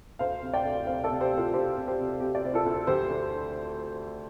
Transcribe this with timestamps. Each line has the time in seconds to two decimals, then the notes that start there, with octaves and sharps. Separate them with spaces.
0.19 D2 C5 F5
0.42 C3
0.53 D5 G5
0.65 D2
0.87 C3 C5 F5
1.04 A4 D5
1.10 C3
1.20 G4 C5
1.32 C3
1.37 F4 A4
1.54 D2 G4 C5
1.76 C3
1.87 G4 C5
1.99 C3
2.20 C3 G4
2.35 D5
2.43 C3 C5
2.54 F4 A4
2.66 D2
2.87 D3 G4 C5
3.10 D2